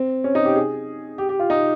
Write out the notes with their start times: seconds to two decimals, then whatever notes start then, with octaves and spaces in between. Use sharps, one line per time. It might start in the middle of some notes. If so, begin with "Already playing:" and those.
Already playing: C4
0.24 C#4
0.35 D#4
0.45 G4
0.56 G#4
1.18 G4
1.29 G4
1.40 F4
1.50 D#4